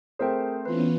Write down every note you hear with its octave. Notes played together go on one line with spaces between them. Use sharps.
A3 C4 G#4 A#4 C5 G5
E3 B3 C#4 F4 B4